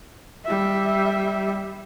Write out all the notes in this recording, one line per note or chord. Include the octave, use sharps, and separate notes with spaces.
G3 E5